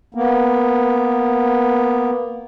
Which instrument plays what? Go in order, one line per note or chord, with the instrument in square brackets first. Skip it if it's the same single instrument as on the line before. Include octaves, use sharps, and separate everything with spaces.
[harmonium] A#3 B3